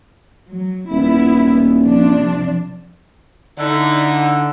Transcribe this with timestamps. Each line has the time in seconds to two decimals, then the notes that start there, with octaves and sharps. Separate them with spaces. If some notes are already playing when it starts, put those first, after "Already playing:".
0.50 F#3
0.91 D#1 B3 E4
1.82 C3 F3 D4
3.58 D3 D#4 E4